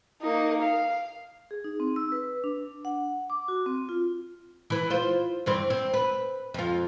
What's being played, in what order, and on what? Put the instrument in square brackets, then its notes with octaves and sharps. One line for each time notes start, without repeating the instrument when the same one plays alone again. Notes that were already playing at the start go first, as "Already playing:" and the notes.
[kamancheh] A#3 D#4
F5
[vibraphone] G#4
D#4
C4
E6
B4
D4
F#5
D6
F#4
C4
F4
[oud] E3 B4
F4 C5
G2 E3 C4
C4
B4
F2 F4